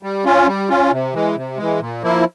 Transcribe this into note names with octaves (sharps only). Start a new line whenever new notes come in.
G3
C#4 F4
G3
C#4 F4
C3
E3 G#3
C3
E3 G#3
A#2
F3 A#3 E4